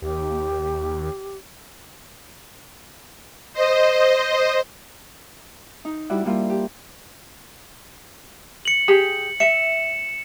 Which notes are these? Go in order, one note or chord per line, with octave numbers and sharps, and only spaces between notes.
D#2 G4
C5 D#5
D#4
G3 D4 E4 F#4
G3 A#3 E4 F4
G4
C#7 F#7
G4 G#4
E5 C#7 E7